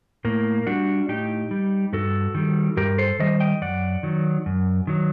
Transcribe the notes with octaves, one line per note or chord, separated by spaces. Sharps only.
A2 A#3
G3 D4 F#4
A2 D#4 G4
G3
G2 F#4 A4
D#3 G3
G2 G4 A#4
A4 C5
D#3 G3 C5 D#5
D#5 G5
F#2 D5 F#5
D#3 F#3
F#2
D#3 F#3